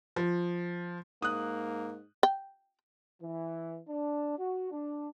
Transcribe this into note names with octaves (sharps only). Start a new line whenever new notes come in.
F3
G#2 A#3 D#6 F#6
G5
E3
D4
F#4
D4